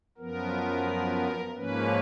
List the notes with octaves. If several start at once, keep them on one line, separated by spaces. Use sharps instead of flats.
F#2 F3 B3 A#4
G#2 F3 A#3 C#4 B4